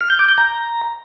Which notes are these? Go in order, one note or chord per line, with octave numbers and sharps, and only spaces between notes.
F6
G6
D6
G6
A#5